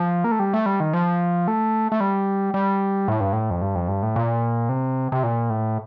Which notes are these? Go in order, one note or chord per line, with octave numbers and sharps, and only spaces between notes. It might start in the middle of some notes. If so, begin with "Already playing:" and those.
Already playing: F3
A#3
A3
G3
A3
G3
D#3
F3
A3
A3
G3
G3
A2
G2
A2
F2
G2
F2
G2
A2
A#2
C3
C3
A#2
A2